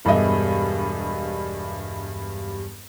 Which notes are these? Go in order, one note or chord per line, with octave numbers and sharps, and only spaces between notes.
E1 G2 G3 B3 D#5 E5